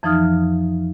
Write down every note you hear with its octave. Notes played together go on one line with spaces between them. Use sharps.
F2 E3 F3 D#4 D#6 F6